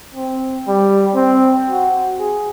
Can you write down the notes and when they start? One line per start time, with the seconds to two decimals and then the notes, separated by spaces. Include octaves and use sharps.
0.15 C4
0.68 G3
1.15 C4
1.69 F#4
2.20 G#4